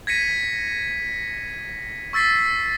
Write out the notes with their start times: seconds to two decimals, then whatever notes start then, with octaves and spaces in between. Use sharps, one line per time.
0.07 G#6 A#6 B6 C#7 D#7
2.13 C#6 E6 A6 B6 C7